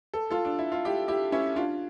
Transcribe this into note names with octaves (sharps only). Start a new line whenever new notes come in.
A4
F4 A4
D4
E4
F4
E4 G4
E4 G4
C#4 E4
D4 F4